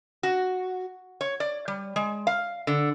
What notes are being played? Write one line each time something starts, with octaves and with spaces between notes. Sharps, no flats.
F#4
C#5
D5
G3
G#3
F5
D3